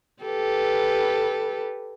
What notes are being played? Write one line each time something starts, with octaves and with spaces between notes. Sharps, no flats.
G4 A4 B4